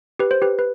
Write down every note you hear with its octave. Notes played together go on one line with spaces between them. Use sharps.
G4 B4
C5
G4 B4
B4